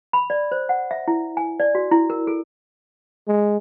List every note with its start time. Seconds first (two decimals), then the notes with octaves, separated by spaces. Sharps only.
0.13 B5
0.30 D5
0.52 C5
0.69 F#5
0.91 E5
1.08 E4
1.37 G#5
1.60 D5
1.75 F#4
1.92 E4
2.10 A#4
2.27 A4
3.28 G#3